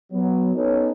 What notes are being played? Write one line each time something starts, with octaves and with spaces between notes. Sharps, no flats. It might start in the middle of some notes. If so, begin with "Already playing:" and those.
F#3 B3
B3 C#4 D#4 A4 B4 C#5